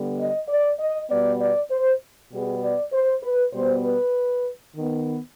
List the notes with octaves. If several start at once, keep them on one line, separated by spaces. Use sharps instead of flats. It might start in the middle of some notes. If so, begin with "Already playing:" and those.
Already playing: D3 G3 B3
D#5
D5
D#5
B2 G3 B3 D5
D5
C5
B2 G3 B3 G#4
D5
C5
B4
B2 G3 B3 C5
B4
D#3 B3